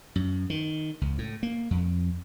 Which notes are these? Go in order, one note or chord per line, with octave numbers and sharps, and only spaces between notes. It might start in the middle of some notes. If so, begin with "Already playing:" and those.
F#2
D#3
C#2
A2
A#3
F2